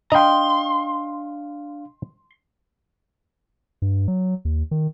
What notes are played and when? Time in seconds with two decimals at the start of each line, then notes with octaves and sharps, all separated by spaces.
0.12 D4 D#5 F5 G5 A#5 C6
3.82 G2
4.08 F#3
4.45 D#2
4.71 D#3